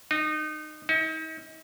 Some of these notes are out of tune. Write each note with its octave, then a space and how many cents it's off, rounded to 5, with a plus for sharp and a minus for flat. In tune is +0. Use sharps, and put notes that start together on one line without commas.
D#4 -25
D#4 +40